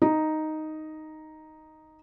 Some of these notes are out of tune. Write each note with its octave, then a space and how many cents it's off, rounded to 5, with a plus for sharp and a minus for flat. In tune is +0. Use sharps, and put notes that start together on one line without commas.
D#4 +0